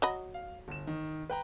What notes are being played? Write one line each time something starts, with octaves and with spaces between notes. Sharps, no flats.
F#3 D#5 B5
F5
G1 E7
D#3
B4 G5 A#5